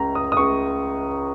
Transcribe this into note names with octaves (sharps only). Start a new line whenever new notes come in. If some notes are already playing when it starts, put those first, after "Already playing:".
Already playing: C#2 C#3 A#5
D#6
D#6
C#2 C#3 C#6